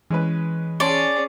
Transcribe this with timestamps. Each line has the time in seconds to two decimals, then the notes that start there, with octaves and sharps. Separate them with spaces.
0.10 E3 G#3 C#4 B4
0.80 C#4 G#4 C#5 D5 A5 C6